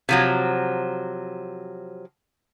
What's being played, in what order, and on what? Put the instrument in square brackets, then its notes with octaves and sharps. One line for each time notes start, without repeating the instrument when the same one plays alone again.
[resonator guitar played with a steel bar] C3 F3 F#3